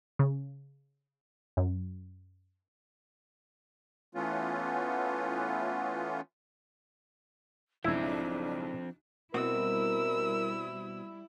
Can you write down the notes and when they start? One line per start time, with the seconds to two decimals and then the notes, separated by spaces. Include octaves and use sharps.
0.19 C#3
1.57 F#2
4.15 E3 A3 B3 C#4 F4
7.84 B1 G#2 C#3 F3 C4 D4 E4
9.34 B2 G3 C4 E4 F#4 A#4 E6